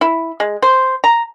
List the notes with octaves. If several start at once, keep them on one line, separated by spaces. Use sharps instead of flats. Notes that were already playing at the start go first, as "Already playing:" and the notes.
E4
G#3
C5
A#5